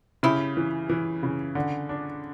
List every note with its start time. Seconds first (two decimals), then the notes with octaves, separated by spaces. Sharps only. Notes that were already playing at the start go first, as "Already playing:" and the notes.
0.23 C#3 E4 G4
0.57 E3
0.89 E3
1.23 C#3
1.55 D3
1.89 D4